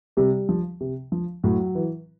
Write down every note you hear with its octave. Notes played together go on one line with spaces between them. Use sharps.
C3 G3
F3
C3
F3
A2 F#3
E3